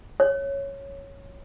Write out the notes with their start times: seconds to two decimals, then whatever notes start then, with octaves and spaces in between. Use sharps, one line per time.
0.20 C#5